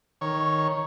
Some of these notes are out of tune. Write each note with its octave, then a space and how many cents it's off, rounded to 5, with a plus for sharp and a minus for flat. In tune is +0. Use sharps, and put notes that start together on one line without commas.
D#3 +5 C#5 +0